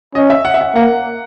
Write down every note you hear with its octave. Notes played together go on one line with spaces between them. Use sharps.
C#4 D#5
E5
F#5
E5
F#5
A#3 F#5